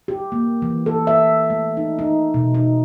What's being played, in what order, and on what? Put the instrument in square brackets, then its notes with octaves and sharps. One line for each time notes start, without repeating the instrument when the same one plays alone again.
[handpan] G4
A#3
E3
A4
E5
A3
D#4
D#4
B2
D#4